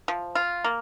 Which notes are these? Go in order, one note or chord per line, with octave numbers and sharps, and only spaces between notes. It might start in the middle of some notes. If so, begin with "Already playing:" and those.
F3
F4
A#3